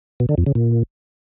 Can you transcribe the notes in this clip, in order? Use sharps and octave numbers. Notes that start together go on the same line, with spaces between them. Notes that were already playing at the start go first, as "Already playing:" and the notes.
B2
D3
F2
C#3
A#2